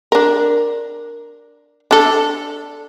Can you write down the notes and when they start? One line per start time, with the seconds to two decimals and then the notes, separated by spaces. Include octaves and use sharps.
0.12 D4 A#4
1.91 D4 A4